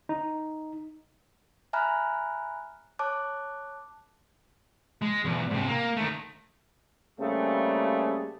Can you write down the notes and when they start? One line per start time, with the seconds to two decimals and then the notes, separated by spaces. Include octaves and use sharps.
0.09 D#4
1.73 E5 G#5 A#5 B5 F6 F#6
2.99 C#5 A5 D6 F#6
5.02 G#3
5.25 B1 E2
5.50 G#2 C3
5.68 A#3
5.96 D#3 A3
7.20 C#3 G3 A3 A#3 C4 G#4